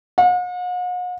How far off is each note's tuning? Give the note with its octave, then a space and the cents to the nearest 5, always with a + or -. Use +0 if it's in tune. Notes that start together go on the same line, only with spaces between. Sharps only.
F#5 -45